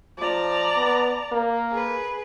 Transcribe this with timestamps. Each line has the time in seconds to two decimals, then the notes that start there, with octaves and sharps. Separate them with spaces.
0.18 F3 D5 A5 A#5
0.76 B3
1.32 A#3
1.71 G#4 B4